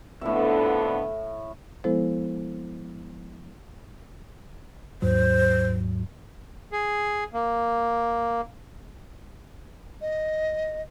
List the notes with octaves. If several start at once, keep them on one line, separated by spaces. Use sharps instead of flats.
F2 A2 D3 B3 E5
F3 G#3 B3 E4 A4 C5
D#2 G#2 F#3 C5
G#4
A#3
D#5